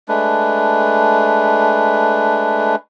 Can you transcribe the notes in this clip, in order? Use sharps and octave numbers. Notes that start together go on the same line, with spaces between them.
G#3 A3 D4 B4